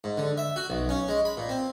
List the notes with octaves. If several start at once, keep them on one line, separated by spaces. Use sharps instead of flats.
G#2
D3
E5
F#4
B1
C#4
G#3
B5
A#2
C4